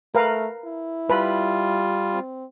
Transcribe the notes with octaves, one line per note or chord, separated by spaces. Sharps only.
A3 A#4 B4 F5
E4
G3 F4 B4 B5
C4